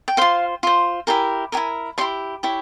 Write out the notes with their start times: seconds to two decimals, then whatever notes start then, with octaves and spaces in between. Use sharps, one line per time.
0.08 G5
0.17 F4 C5 F5
0.63 F4 C5
1.07 E4 G4 A#4 G#5
1.52 E4 G4 A#4 G#5
1.98 E4 G4 C#5 C6
2.43 E4 G4 C#5